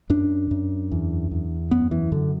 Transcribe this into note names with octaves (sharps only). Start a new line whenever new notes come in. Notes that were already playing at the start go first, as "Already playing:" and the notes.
F#2 D4
F#2
E2
E2
F#2 B3
E3
F#2 D3